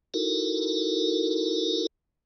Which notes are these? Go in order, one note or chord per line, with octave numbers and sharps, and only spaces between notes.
D#4 E4 F#4 A4 A#4